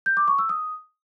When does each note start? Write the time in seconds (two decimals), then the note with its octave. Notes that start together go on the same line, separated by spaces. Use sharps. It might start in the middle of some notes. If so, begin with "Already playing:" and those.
0.06 G6
0.17 D6
0.28 C#6
0.39 E6
0.49 D#6